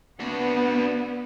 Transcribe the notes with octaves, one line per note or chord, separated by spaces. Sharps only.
B3 D4 F#4